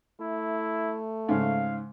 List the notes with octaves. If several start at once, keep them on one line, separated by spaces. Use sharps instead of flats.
A3 E4
G#2 C#3 F5